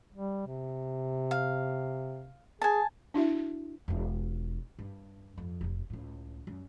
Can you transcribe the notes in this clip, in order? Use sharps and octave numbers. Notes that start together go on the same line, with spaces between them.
G3
C3
F5
G#4 G#5 A5
D4 E4 F#4 E5
E1 F4
G2
F2
F1 C3
C#2 A2
F#2 G3